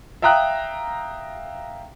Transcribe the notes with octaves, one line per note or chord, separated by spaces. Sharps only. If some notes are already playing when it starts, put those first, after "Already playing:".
E5 F5 G5 A#5 D#6 F#6